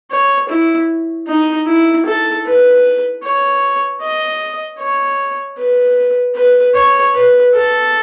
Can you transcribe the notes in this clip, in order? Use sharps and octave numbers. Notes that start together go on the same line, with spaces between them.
C#5
E4
D#4
E4
A4
B4
C#5
D#5
C#5
B4
B4
C#5
B4
A4